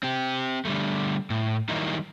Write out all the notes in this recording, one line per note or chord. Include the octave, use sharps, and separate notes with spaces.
C4 G4
D3 G3 A3
A2
D#3 F#3 G3 A#3 D#4 E4